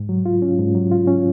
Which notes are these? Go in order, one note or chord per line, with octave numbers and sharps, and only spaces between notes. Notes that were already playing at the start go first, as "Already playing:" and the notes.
Already playing: G#2
F#3
F4
C#4
G#2
F#3
F4
C#4